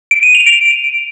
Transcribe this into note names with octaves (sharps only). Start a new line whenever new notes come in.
D7
D#7
F7
D7